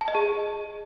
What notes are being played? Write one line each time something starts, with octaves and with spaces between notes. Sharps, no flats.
A5
D#5
G#4